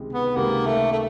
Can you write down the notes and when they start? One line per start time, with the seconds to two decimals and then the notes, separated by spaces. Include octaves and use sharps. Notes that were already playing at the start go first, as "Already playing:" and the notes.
Already playing: C#2 C3 D#3 G#3
0.13 B3
0.36 C#2 C3 D#3 A#3
0.66 A3
0.92 A3